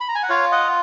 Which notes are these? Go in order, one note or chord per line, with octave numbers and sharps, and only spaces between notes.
B5
A#5
G#5
F#5
F4 C#5 F5
D#5 F#5